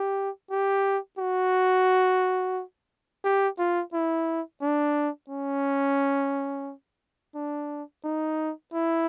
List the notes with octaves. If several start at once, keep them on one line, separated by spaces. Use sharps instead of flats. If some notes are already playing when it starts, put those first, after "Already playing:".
Already playing: G4
G4
F#4
G4
F4
E4
D4
C#4
D4
D#4
E4